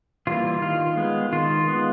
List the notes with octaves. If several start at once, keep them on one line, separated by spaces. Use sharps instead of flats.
E3 G3 A#3 F4
D#3 F4
G#3 B3
D#3 F4
G#3 B3